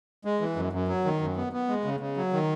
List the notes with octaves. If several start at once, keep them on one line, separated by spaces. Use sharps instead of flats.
G#3
E3
F#2
F#2
F#3
D#3
F#2
B3
B3
G#3
C#3
C#3
F#3
D#3